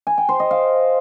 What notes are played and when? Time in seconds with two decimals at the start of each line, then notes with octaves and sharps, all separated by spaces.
0.07 G#5
0.18 G5
0.29 C5
0.40 D#5
0.51 F5